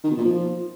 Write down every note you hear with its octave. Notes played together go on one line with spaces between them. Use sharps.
D#3
B2
A#2
F3